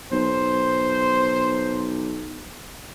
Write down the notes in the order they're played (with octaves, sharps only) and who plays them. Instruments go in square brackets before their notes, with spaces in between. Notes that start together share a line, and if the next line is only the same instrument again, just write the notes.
[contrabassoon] B1 [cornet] C5